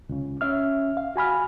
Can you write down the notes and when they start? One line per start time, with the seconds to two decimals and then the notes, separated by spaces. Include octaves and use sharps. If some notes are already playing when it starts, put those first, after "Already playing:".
0.09 C#2 C#3
0.41 C#4 E5 F6
0.97 F5
1.16 F#4 G#5 B5 F6